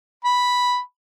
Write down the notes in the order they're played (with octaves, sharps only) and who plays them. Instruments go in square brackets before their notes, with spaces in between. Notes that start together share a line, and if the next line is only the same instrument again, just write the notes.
[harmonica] B5